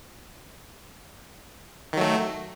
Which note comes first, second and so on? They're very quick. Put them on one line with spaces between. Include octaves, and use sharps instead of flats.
D#3 F#3 A3